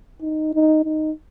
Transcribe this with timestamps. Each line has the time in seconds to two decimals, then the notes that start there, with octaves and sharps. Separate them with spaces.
0.21 D#4
0.54 D#4
0.84 D#4